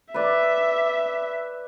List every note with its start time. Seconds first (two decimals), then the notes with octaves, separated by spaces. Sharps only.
0.14 B4 D5 E5